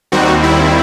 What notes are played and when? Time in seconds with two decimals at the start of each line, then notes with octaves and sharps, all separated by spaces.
0.12 D#2 D#3 G3 C4 F#4
0.43 E4